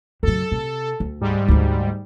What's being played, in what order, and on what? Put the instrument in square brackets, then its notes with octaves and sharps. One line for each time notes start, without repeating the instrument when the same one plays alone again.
[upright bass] F#2 C#3 [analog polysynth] A4
[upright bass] C3
D2
[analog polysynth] G#2 G3
[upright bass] D2 G#3